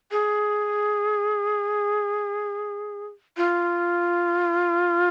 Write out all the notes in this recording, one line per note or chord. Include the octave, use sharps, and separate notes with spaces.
G#4
F4